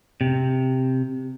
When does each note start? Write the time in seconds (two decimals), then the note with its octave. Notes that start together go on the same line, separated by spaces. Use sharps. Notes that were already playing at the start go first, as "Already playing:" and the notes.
0.21 C3